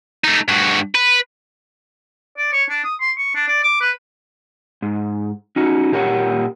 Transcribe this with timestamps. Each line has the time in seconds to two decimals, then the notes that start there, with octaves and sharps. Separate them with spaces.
0.24 A3 D#4
0.48 G2 F#4
0.95 B4
2.38 D5
2.53 C#5
2.69 D4
2.84 D#6
3.00 C6
3.17 C#6
3.35 D4
3.48 D5
3.63 D6
3.81 B4
4.82 G#2
5.56 C#4 D#4 F#4
5.92 A#2 G4 A#4 C#5 F#5